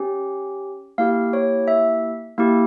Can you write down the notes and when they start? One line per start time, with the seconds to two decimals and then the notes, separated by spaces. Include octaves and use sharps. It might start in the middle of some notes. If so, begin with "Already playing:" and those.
Already playing: C#4 G4
0.98 A#3 E4 G4 F5
1.33 C#5
1.68 E5
2.38 A#3 E4 G4